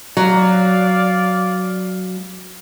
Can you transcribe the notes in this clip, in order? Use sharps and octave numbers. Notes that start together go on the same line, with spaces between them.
F#3 D5 F5